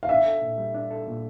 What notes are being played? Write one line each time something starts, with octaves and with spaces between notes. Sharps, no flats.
F5
D4 E5
A4
A#2
G3
D4
A4
A#2